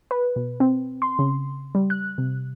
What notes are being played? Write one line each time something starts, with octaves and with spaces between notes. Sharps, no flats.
B4
B2
C4
C6
C#3
G3
F#6
C3